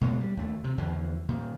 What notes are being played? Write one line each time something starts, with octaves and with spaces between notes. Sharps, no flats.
B2 G#3 A#3
G3
D#2 A3
C3
E2 D3 F3
A#2 D#3